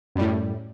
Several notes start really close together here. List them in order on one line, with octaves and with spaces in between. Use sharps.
F#2 G3 A2